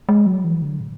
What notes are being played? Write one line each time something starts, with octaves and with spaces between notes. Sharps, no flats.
G#3
F#3
E3
D3
A2